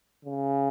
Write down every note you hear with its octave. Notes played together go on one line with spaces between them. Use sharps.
C#3